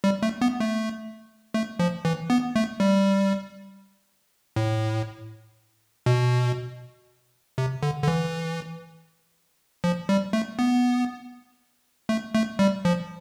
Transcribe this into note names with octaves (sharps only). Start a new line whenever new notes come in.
G3
A3
B3
A3
A3
F3
E3
B3
A3
G3
A2
B2
C3
D3
D3
E3
F3
G3
A3
B3
A3
A3
G3
F3